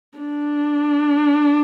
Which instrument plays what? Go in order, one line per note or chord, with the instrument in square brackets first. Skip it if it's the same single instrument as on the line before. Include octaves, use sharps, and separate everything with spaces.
[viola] D4